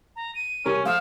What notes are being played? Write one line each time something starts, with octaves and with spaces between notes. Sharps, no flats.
A#5
D#7
C2 C#4 G4 A#4
F3 A3 F5 E6